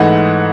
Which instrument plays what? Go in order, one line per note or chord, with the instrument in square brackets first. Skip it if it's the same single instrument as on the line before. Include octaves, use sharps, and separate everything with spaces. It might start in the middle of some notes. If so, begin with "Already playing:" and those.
Already playing: [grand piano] G#2 E3 A3 D#4 F#5